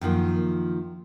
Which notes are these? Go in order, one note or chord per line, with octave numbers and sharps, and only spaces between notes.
F#2 D#3 F3 A#3